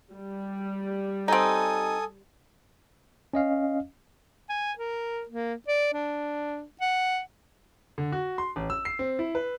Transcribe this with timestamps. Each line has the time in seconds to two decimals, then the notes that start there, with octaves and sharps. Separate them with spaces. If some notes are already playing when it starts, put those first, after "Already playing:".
0.14 G3
1.28 C4 D#4 A4 G#5 D#6
3.33 C#4 D#5 F5
4.50 G#5
4.79 A#4
5.28 A#3
5.68 D5
5.94 D4
6.81 F#5
7.98 D3
8.12 F#4
8.38 C6
8.56 A1
8.70 E6
8.85 C7
8.99 C4
9.19 E4
9.35 B4